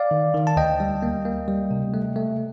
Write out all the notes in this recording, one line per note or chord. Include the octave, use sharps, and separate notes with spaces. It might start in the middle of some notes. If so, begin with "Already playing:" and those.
Already playing: D5 F5
D#3
D#3
A5
D2 D#5 G5
G3
A#3
A#3
G3
C3
A3
A3